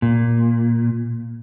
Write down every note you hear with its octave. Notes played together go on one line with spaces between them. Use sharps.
A#2